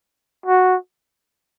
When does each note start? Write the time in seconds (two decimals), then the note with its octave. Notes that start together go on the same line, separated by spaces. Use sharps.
0.46 F#4